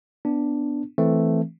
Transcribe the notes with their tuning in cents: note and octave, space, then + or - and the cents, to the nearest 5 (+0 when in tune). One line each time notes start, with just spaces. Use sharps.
B3 +5 D4 +0
E3 +0 A3 +0 C4 +0